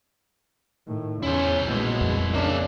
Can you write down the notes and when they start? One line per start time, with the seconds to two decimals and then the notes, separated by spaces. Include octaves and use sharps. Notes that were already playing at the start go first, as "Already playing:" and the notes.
0.87 A2 D#3
1.23 E2 C#4 E4 C5
1.66 A#1 B2 G#3
2.01 F2
2.34 C#3 A#3 D4 E5